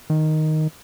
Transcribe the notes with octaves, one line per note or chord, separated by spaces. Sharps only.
D#3